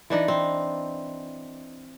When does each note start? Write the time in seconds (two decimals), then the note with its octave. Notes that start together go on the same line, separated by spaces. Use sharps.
0.10 E3 D4 D#4
0.28 C4